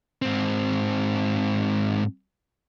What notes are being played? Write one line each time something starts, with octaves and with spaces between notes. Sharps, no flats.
G#2 C4